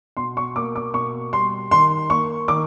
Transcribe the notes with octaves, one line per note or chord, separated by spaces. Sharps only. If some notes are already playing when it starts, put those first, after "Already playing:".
B2 C6
C#6
A#3 D6
D6
B2 C#6
G3 C6
D#3 C6
A#3 C#6
D#3 D6